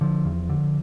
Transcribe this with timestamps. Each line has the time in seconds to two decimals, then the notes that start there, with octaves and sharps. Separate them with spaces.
0.01 D3 F3
0.25 E2
0.49 D3